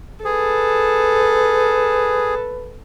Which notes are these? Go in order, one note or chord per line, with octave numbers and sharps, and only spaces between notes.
G#4 A4 B4